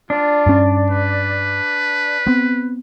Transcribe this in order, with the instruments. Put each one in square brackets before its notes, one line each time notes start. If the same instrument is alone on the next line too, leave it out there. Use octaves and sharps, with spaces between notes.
[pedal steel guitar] D4 [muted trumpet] F4
[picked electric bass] G2 C#4
[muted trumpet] B4
[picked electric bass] B3 C4